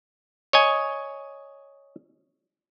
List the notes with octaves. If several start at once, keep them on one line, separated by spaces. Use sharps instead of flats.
C#5 D#5 G#5